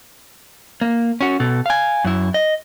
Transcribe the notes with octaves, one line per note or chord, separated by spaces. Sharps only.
A#3
C#4 F#4
B2 A4
F5 G#5
F#2 E4
D#5